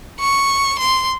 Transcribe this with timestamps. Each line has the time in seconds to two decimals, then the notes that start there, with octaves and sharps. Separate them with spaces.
0.20 C#6
0.79 C6